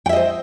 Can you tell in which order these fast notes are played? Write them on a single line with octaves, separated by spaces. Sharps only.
G5 E5 D#5 C5